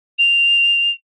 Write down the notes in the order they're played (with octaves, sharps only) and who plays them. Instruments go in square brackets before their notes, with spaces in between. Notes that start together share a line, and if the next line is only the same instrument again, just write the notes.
[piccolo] F7